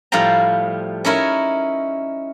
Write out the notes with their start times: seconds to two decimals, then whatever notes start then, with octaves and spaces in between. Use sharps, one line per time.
0.12 A2 F3 G3 F5 G5 A#5
1.05 C#4 D#4 E4 A#4 C#5